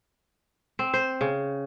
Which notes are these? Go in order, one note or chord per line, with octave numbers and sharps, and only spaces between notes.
C4
C5
C#3